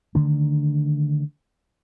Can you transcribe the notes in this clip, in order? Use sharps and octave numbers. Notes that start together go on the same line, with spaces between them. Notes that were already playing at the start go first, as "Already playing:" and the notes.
D3 D#3 A3 D4